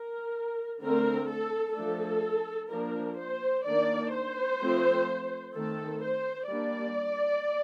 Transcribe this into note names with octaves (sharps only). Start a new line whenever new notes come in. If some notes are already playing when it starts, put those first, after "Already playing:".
Already playing: A#4
D3 A3 C4 A#4
A4
F3 A3 D4 A4
F3 A#3 D4 A#4
C5
D#3 A#3 D4 D5
C5
F3 A3 C4
D#3 A3 C4 A4
C5
G3 A#3 D4 D5